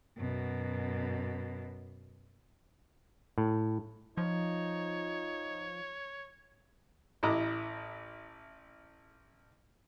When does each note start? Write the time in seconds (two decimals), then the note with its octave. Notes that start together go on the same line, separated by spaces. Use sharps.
0.18 F#2 B2
3.38 A2
4.17 F3 D#4 C#5
7.23 A1 E4 D#5 A#5 D6